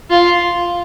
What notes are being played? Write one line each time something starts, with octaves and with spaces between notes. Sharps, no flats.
F4